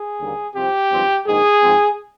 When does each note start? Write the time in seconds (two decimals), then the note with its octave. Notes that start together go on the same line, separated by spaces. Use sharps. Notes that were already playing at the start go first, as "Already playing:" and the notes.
Already playing: G#4
0.20 D#2 D3 G3 A#3
0.55 C2 C3 F3 C4 G4
0.91 G#1 G2 F3 C4
1.26 A#1 G#2 D#3 G#4
1.62 G#2 F3 C4